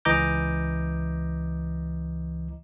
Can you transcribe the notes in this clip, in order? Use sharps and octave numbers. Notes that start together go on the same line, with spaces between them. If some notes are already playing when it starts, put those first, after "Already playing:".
C#2 E3 D#5 A#5 D6 G6